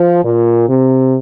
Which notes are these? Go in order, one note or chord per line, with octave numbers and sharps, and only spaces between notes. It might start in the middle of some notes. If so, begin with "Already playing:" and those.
Already playing: F3
A#2
C3